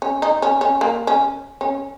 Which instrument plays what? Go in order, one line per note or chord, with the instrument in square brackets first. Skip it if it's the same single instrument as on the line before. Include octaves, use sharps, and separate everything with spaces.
[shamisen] C#4
D#4
C#4
C#4
A#3
C#4
C#4